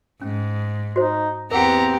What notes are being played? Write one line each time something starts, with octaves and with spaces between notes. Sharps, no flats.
G#2 C#4
D#4 F#4 C5
E2 B3 C4 G4 A#4 F#5 G5 A#5